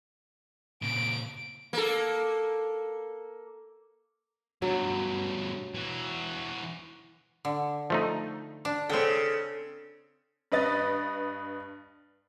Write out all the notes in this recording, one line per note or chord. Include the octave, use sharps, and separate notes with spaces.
A#2 C#3 D7
A#3 A4
G2 B2 F#3
E3 F#4
D3
F3 A3 D#4
D4
C#3 C4 A4 G5
G2 B4 D#5 A6